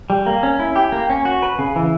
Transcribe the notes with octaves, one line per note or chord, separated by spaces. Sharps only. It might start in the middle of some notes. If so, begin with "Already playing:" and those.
G3
A#3
C#4
E4
G4
A#3
C#4
F#4
B4
C#3
E3